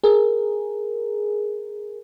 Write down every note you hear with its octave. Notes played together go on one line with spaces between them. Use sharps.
G#4 A#4